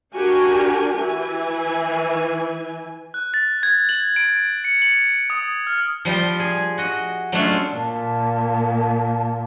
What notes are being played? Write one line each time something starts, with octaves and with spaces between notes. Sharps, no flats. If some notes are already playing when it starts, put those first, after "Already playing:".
D4 F#4 G4 A#4 G#5
E3 G#5
F#6
A6
G#6
F#7
D7
C#7
F#7
D#6
F6
F3 G3 F4 G5
G#4
F#4 D#5
F#3 G#3 A3 C#4 D4 F4
A#2 A5